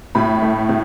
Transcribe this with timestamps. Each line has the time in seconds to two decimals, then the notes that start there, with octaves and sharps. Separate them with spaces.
0.15 A2 B5
0.42 A3
0.69 A2